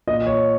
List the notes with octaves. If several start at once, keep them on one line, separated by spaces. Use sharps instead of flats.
A#2 D#5
C#5